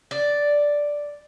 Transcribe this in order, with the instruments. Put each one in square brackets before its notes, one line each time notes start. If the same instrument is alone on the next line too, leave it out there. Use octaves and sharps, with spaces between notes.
[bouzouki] D5